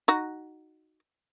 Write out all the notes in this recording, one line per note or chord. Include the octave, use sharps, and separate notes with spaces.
D#4 F#4